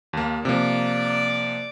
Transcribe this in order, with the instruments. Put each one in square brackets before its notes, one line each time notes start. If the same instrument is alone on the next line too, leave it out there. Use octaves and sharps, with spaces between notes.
[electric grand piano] D#2 A#3
[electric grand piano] C3 F3 A#3 [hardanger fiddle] D5